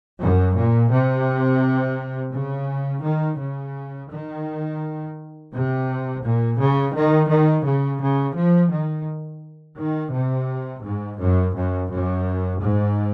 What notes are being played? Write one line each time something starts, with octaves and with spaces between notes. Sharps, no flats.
F#2
A#2
C3
C#3
D#3
C#3
D#3
C3
A#2
C#3
D#3
D#3
C#3
C#3
F3
D#3
D#3
C3
G#2
F#2
F#2
F#2
G#2